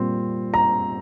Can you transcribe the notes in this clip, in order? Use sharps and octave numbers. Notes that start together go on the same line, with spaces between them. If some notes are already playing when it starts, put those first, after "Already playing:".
Already playing: A#2 G3 C4
A#5